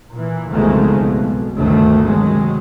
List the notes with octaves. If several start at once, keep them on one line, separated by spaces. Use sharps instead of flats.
A#2 E3
F#1 B1 F2 D#3 G#3 A3
B1 B2
G1 D2 D3 D#3 A3
C3 D#3 F#3 G#3